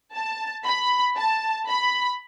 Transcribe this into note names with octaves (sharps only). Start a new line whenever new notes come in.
A5
B5
A5
B5